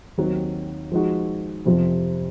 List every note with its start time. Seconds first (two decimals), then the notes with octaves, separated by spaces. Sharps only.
0.18 D#2 D#3 F#3 C4
0.92 F3 G#3 D#4 F#4
1.65 F2 C3 F3